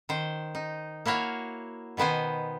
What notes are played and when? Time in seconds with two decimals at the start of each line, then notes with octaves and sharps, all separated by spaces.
0.09 D#3 C5
0.55 D#4
1.06 A#3 E4 F#4 C#5 F5
1.97 B2 D#3 B3 C5 G#5